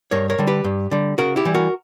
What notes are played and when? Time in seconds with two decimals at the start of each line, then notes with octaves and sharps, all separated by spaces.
0.11 G2 A#4 C#5
0.30 A#4 C#5
0.38 D3 G3
0.47 G4 B4
0.64 G2
0.91 D3 G3
1.18 C#3 F#4 A#4
1.36 E4 G4
1.45 E3 G3
1.54 F#4 A#4